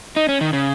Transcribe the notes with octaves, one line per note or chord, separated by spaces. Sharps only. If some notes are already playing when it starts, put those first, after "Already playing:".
D#4
C#4
D#3
C#3